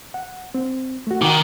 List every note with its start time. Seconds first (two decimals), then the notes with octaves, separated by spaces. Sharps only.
0.14 F#5
0.54 C4
1.07 A3 F#4
1.22 D#3 F#5 G5 D6